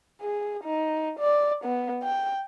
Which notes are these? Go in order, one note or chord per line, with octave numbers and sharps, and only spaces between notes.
G#4
D#4
D5
B3
G5